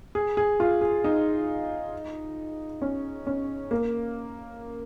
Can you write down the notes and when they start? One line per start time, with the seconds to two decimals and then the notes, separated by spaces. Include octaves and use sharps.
0.15 G#4
0.37 G#4
0.60 F4
0.81 G#4
1.04 D#4
2.82 C#4
3.27 C#4
3.71 A#3